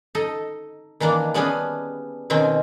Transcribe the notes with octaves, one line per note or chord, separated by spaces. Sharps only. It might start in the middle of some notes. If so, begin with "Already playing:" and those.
D#4 A4 D#5
D#3 E3 A#3 D4
G3 B3 C#4 D4 G#4
B2 D#3 C4 C#4